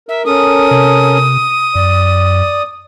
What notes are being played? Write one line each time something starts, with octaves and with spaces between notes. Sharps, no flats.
A#4 E5
C#4 A4 A#4 D#6
C3
F#2 D5